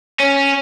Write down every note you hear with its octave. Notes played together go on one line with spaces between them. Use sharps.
C#4